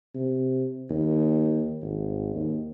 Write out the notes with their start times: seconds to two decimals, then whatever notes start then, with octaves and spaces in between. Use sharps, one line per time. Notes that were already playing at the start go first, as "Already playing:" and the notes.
0.15 C3
0.90 D#2
1.82 G#1
2.35 D#2